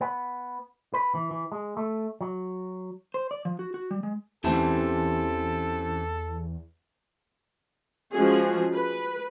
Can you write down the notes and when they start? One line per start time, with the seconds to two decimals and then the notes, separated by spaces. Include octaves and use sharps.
0.01 B3
0.94 B4
1.15 E3
1.31 E3
1.52 G#3
1.77 A3
2.21 F#3
3.14 C5
3.31 D5
3.45 F3
3.59 F#4
3.74 F#4
3.91 G3
4.03 G#3
4.44 E2 E3 C4 C#4 E4 G4 A4 A5
8.13 F3 G#3 C#4 F#4 G#4
8.74 B4